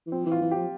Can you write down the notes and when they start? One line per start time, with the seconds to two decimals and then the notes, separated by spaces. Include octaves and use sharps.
0.06 E3
0.12 F3 C4
0.26 E3
0.32 F4
0.42 E3
0.51 F3 G4